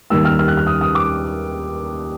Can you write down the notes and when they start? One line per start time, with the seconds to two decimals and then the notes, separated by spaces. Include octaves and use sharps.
0.10 D#2 D#3 G3 A#3 E6
0.25 F6
0.39 F6
0.48 F#6
0.57 F6
0.67 D#6
0.81 D#6
0.95 D6